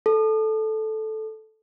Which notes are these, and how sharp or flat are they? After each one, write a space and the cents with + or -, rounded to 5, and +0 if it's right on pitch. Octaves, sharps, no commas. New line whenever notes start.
A4 -10